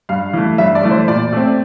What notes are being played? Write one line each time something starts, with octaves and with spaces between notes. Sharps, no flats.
G2 F5
E3 A3
G2 E5
D5
E3 A3
C5
A#2 D5
A3 C4